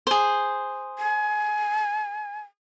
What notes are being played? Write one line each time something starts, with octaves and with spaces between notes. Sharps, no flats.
G#4 C5
G#5